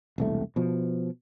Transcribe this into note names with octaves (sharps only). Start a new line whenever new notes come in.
E1 C2 A3
B2 F3